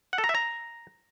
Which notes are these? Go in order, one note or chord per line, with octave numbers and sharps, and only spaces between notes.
F#5
A4
A#5
E5
A#5